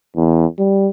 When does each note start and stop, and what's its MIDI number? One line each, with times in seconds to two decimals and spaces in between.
0.17 0.46 40
0.59 0.89 55